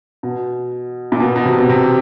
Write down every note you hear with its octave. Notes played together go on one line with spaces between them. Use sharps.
B2
A#2
B2
B2
C3
B2
C3